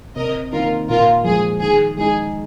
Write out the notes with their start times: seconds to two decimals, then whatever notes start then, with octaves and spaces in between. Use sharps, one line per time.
0.16 C3 A#4 D#5
0.52 D#3 A#3 D#4 F4 A#4
0.89 A#2 F4 A#4
1.24 F3 G#3 G#4
1.61 D#3 G#4
1.97 G#3 D#4 G#4